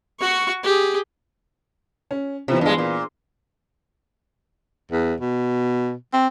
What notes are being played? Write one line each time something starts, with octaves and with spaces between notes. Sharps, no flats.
F#4 C#6
G4 G#4
C#4
C3 E3 B3 F4
G2 G#3
A#2
E2
B2
C4